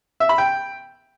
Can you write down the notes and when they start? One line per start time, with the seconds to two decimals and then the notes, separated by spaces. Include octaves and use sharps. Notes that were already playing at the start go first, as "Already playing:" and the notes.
0.20 E5
0.29 B5
0.38 G5